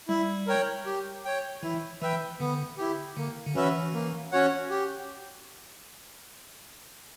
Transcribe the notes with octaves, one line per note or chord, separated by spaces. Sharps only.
G3 E4
A#4 C#5 G5
G4
C#5 G5
E3 E4
E3 B4 E5 G5
D3 B3
E4 G4
D3 A#3
D3
E3 C#4 F#4 B4 E5
A#3
C#4 F#4 C#5 F#5
G4